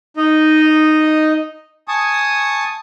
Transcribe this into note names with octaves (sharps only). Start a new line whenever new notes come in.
D#4 D#5
G#5 A5 C#6 D#6